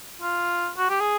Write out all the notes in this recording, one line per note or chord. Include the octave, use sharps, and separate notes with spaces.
F4
F#4
G4
G#4